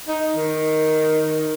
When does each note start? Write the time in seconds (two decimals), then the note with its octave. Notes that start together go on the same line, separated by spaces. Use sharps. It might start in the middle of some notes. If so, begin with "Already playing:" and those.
0.08 D#4
0.36 D#3